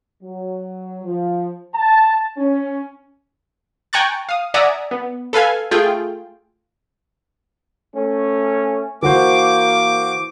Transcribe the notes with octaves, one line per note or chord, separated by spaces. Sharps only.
F#3
F3
A5
C#4
G5 G#5 A#5 C#6 F#6 A6
F5 D#6
D5 E5 F#5 G#5 A#5 D#6
B3
A4 B4 F5 G#5
A3 F4 G#4 G5
A3 C#4
E3 A#3 F#4 C5 D6